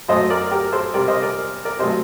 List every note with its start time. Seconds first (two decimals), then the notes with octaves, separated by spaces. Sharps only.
0.08 F#2 F#3 A3 C5 D#5
0.30 A#4 D5
0.51 G4 A#4
0.72 A4 C5
0.94 C3 G3 A#4 D5
1.08 C5 D#5
1.23 A#4 D5
1.65 A#4 D5
1.79 C3 F#3 A3 C5 D#5